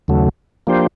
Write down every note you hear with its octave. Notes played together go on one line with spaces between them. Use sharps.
D#2 C#3 F#3 A3
F3 A#3 D4 G4 C5